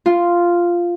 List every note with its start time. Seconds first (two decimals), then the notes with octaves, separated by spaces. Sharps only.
0.06 F4